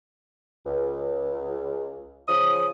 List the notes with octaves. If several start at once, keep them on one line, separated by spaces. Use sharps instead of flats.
C#2
C#3 F3 D#6